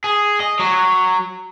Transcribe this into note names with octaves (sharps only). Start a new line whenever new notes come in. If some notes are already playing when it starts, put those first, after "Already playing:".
G#4
D#5
F#3